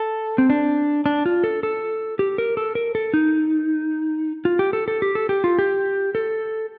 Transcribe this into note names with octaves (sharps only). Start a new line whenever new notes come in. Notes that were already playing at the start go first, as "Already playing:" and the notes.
Already playing: A4
C4
D4
D4
F4
A4
A4
G4
A#4
A4
A#4
A4
D#4
F4
G4
A4
A4
G4
A4
G4
F4
G4
A4